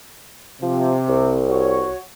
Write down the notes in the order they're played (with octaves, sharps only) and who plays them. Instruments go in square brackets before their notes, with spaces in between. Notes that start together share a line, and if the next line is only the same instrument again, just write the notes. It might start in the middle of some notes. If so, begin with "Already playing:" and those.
[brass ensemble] C3 [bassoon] F3
[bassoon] C2
[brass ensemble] F#4 C#5